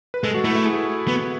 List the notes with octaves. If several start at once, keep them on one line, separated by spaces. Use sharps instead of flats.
B4
G#3 A4
F#4
A3 E4
E4
G#4
B3